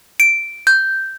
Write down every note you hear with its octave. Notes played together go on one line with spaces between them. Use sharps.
D7
G6